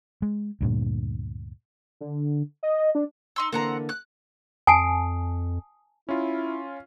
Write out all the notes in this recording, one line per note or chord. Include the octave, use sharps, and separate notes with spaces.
G#3
D2 G2 A#2
D3
D#5
D4
D#4 C6 E6
D3 E3 A#3 C4 F#5 A#5
F#6
F2 G#5 A5 D#6 C7 D7
C#4 E4 F4